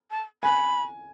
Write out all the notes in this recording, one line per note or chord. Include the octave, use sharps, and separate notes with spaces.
A5
G#5 B5